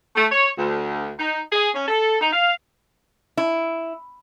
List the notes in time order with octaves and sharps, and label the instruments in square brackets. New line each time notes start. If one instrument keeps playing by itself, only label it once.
[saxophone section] A3
C#5
D2
D#4
G#4
C#4
A4
D#4
F5
[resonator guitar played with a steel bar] E4